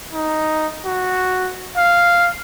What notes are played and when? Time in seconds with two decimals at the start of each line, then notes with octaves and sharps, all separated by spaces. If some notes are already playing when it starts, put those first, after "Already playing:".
0.13 D#4
0.85 F#4
1.76 F5